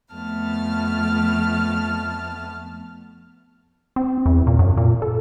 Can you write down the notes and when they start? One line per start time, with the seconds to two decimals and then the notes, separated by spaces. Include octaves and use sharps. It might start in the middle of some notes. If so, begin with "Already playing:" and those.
0.15 F2 A3 B3 A5 F6
3.96 C4
4.26 E2
4.47 A#2
4.59 F#2
4.77 A#2
5.02 A4